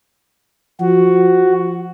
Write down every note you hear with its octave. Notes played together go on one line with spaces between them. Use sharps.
F3 F#4